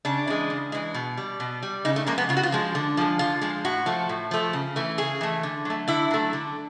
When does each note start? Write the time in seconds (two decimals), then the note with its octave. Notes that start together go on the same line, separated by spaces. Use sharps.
0.05 C#3 D4
0.27 E3 G#3
0.50 C#3
0.72 E3 G#3
0.94 B2
1.17 G3
1.40 B2
1.63 G3
1.85 C#3 D#4
1.96 A3
2.06 F3 G#3 A#3
2.18 B3
2.29 C#3 F4
2.37 F#4
2.43 F4
2.52 F3 G#3
2.75 D3
2.97 F3 G#3
3.19 D3 F4
3.41 F3 G#3
3.65 A2 F#4
3.86 F3 A3
4.09 A2
4.31 F3 A3
4.53 C#3
4.76 E3 A3
4.98 C#3 G#4
5.21 E3 A3
5.43 D3
5.65 F#3 A3
5.88 D3 E4
6.11 F#3 A3
6.33 D3